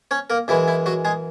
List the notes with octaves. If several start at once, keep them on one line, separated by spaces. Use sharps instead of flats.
C#4 C#5
A#3 A#4
F#2 E3 G#3 E4
E4
F#3 F#4
G#3 G#4